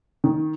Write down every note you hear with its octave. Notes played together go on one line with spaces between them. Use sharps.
D#3